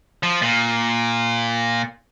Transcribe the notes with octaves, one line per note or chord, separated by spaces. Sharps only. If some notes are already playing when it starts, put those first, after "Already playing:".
F3
A#2